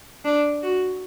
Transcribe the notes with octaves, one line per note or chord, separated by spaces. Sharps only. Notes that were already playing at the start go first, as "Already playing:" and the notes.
D4
F#4